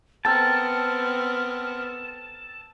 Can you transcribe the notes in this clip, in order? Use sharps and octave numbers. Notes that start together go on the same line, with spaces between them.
B3 C4 A4 A#4 G5 A5 F6